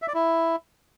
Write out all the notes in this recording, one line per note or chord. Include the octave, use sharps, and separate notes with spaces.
E5
D5
E4